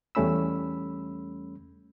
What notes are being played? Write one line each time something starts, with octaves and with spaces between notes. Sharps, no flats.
E2 G3 A3 C#4 B5 E6